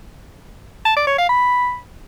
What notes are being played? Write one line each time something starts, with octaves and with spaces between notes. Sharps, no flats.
A5
D5
C#5
F5
B5